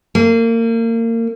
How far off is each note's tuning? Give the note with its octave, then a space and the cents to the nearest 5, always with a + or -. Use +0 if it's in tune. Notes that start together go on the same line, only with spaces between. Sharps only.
A#3 -30